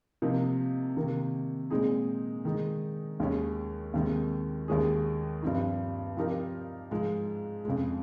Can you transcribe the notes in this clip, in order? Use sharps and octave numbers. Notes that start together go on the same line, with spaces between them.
C3 F3 A#3 D#4
C3 D#3 A#3
A#2 G#3 C4 D#4 G#4
D#3 G#3 D#4
D#2 D#3 G#3 C#4
D#2 D#3 G#3 C4
D#2 D#3 G#3 C#4 G#4
G2 F3 C4 D#4
F3 C4 D#4 G4 A#4
G#2 F3 G#3
F2 C#3 G#3